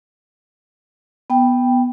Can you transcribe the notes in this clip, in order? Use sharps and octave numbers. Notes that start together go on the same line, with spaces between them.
B3 G5